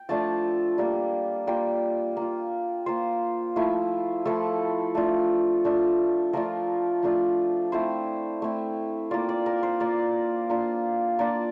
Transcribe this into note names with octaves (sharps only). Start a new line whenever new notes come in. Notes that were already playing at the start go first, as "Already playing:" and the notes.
Already playing: G5
F3 A3 D4 F4 A5
G3 A#3 F4
G3 A#3 F4 G5
A#3 F4
A#3 F4 C5
F3 A3 E4
F3 A3 E4 A4
A3 D4 F4
A3 D4 F4
F3 A3 D4 F4 A#4
F3 A3 D4 F4
A3 C4 E4 C5
A3 C4 E4
A#3 F4 D5
D5
A#4
C5
A#3 F4 D5
A#3 D4 F4
A#3 D4 F4 D5